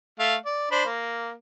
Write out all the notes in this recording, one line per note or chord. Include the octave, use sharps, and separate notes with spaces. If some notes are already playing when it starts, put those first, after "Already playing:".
A3 F5
D5
D4 C5 B5
A#3